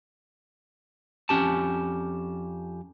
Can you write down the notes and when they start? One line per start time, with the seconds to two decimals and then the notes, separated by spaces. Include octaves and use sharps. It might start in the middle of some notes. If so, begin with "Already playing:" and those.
1.29 F2 C#4 G4 A5